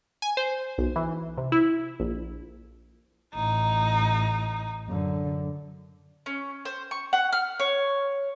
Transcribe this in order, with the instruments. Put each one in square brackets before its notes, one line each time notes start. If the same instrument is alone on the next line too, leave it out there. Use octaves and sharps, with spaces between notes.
[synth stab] G#5
C5
B1
E3
C3
E4
A#1
[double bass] A1 [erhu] D#4
[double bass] F#2 D3
[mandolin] C#4
C5
C#6
F#5
F6
C#5